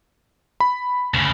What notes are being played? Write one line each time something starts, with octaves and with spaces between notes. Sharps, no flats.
B5
D2 C#3